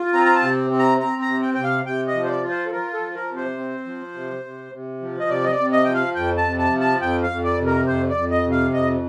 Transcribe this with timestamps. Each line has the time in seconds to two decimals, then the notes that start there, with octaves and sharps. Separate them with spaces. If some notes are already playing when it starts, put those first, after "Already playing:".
Already playing: F4
0.13 C4 A#5
0.25 A#5
0.35 A5
0.42 C3
0.71 C4
0.79 A#5
1.00 C4 A#5
1.22 A#5
1.28 C3
1.42 G5
1.54 C3 G5
1.64 F5
1.85 C3 G5
2.07 D#5
2.15 F3
2.24 C5
2.28 D5
2.43 F4
2.50 C5
2.66 A4
2.71 F4 A#4
2.93 A4
3.00 F3
3.15 A#4
3.30 C3
3.36 C5
3.57 C4
3.86 F3
4.14 C3
4.43 C3
4.72 C3
5.02 F3
5.20 D#5
5.29 C3 D5
5.44 D#5
5.51 D5
5.58 C3
5.72 D#5
5.85 F3 G5
5.94 F5
6.15 F2 G5
6.37 A5
6.44 C3
6.58 A5
6.72 F3
6.80 A5
7.01 F2 G5
7.23 F5
7.30 F2
7.44 D5
7.59 C3
7.66 A#4
7.87 F2 C5
8.10 D5
8.16 F2
8.30 D#5
8.45 C3
8.52 F5
8.74 F2 D#5